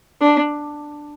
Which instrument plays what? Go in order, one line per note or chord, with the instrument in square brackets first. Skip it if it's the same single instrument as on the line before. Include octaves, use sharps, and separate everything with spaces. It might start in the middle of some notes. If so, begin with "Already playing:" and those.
[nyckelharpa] D4